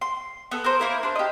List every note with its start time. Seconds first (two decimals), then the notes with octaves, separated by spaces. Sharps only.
0.01 C6
0.51 B3 A4
0.64 A#4 C5
0.79 A#3 E4 A#4
1.03 D4 C5
1.16 G4 D#5